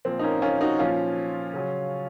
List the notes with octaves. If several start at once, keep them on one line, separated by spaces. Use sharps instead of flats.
A#2 F3 C4
D#4
A#3 C#4
C#4 F4
D#4 F#4
A#2 F3 C#4 F4
C#3 F#3